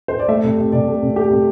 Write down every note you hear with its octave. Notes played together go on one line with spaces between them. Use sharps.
C5
D5
A3 E5
C3
C3
C3 D5
A3
C3
A3 G4
C3